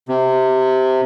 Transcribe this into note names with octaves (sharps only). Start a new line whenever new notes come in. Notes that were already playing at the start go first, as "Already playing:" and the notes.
C3